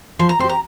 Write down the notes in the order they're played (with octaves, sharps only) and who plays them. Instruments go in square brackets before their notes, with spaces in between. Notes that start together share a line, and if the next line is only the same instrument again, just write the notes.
[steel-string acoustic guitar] F3 [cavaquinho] C6
[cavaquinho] A#5
[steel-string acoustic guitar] C4 G4 [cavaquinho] C6
[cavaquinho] A#5